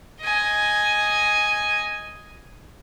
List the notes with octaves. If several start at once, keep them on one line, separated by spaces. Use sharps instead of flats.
D#5 G#5